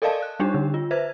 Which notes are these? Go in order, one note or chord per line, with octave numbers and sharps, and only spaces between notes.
A4 A#4 D5 D#5 F5 A5
F#6
G3 D4 D#4 G4
D3
F4
B4 C5 E5 G#6